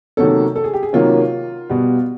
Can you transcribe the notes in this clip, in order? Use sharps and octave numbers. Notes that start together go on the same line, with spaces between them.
C3 D#3 F#3 A#3 C#4 A4
A4
G#4
G4
G#4
C3 D#3 F#3 A#3 C#4 F4
B2 G3 B3